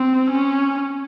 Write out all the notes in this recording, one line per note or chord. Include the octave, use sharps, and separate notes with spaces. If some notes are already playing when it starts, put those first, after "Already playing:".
Already playing: C4
C#4